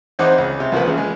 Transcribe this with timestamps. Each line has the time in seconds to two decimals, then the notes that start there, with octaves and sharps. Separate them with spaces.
0.19 E2 C4 D#4 C5 F#5 D6
0.38 C#2
0.60 C3
0.72 C2 F3 A#3 B4
0.86 E2 C#3
0.98 G#3